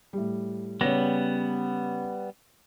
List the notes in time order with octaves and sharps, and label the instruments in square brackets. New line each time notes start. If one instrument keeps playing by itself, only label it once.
[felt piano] A2 G3
[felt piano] C#3 C#5 A#6 [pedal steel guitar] G3 B3